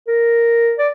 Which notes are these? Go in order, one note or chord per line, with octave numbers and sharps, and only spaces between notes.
A#4
D5